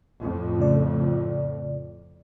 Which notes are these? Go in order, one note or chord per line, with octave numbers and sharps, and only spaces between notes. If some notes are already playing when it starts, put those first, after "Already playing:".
F2 A2
C#3 A3 D5